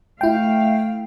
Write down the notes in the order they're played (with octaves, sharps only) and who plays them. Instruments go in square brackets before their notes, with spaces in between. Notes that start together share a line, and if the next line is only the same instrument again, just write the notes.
[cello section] A3 F5 [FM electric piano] E4 G5